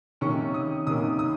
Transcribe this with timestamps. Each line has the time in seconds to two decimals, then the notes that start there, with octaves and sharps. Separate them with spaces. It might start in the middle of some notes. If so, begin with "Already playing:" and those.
0.21 C3 D#3 A#3 C#4 C#6
0.54 D#6
0.87 C3 D#3 A#3 C#4 D#6
1.19 D#6